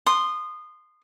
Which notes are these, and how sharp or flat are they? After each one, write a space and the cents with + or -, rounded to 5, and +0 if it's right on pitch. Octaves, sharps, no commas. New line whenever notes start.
C6 +0 D#6 -25